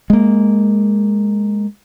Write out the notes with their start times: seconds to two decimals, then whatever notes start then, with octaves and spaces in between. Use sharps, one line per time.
0.10 G#3 A#3